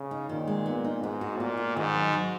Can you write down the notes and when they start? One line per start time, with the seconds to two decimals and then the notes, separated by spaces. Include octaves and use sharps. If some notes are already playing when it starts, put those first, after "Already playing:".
Already playing: C#3
0.11 D#4
0.29 A#2 D#3
0.47 G#3
0.66 B3
0.84 D#4
1.03 G#2 B3
1.21 F#4
1.39 A#2 A#3
1.57 F4
1.77 G#2 D#3
1.94 F#3
2.13 F#3